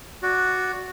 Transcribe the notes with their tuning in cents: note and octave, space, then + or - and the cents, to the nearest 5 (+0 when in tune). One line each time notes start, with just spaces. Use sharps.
F#4 +0 D5 -10